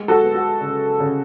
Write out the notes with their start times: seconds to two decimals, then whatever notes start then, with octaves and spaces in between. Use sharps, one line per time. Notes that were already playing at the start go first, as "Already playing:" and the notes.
Already playing: G#3
0.08 F#4 A4
0.22 B3
0.35 F#4
0.61 C#3
1.00 C#3